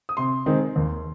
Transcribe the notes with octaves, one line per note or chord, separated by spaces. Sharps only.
D#6
C3 C6
D#3 G#3 C4 D#4
D#2